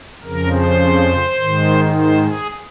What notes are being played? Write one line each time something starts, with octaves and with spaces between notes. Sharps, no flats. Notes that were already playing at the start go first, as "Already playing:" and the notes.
F2 C#3 F3 A#4
C5
G#2 D#3
C5
G#4